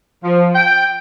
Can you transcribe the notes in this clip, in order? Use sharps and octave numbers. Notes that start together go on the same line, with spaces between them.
F3
G5